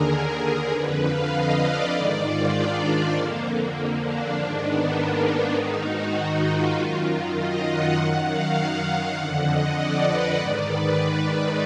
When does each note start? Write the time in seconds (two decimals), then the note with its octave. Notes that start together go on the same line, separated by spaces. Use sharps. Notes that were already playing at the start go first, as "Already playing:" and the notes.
Already playing: D#2 D3 G#4 A#4
0.70 F2 D3 B4
1.01 F5
1.31 D#5
1.61 D5
1.91 G#2 D#3
2.21 F4
2.51 D4
3.12 F2 D3 A#3
3.41 A#3
4.02 D4
4.33 G#2 D#3
4.62 B3
4.92 A#3
5.22 A#3
5.52 G#2 D#3 D#4
5.83 F#4
6.43 F4
6.73 F#2 D#3
7.33 D#5
7.64 F#5
7.93 F#2 D#3
8.24 F5
8.84 F#5
9.14 F2 D3
9.44 D#5
9.74 D5
10.04 B4
10.34 G#2 D#3 D5
10.64 B4